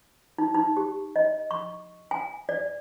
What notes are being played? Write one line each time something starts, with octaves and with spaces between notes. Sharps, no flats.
D#4
D#4
G4
D#5
C#6
G#5
D5